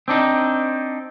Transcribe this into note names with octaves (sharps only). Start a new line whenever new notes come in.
C4 D4 D#4